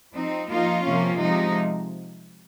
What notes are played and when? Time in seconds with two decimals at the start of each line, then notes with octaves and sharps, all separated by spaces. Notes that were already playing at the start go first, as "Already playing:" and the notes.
0.15 F3 C4 D#4
0.50 F3 A#3 D#4 F4
0.85 C3 F3 A#3 C#4
1.21 C3 F3 G#3 D#4